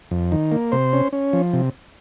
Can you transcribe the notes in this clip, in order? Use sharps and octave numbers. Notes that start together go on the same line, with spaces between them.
F2
D#3
A#3
C3 C5
C#4
C#4
F3
C3